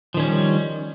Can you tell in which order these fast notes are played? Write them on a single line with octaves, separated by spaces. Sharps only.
F3 D#3 C#4 G3